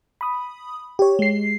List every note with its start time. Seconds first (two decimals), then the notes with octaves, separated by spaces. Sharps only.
0.21 B5 D#6
0.99 G4 C#5
1.19 G#3 C7